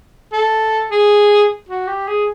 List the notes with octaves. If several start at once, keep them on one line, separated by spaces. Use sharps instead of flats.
A4
G#4
F#4
G4
G#4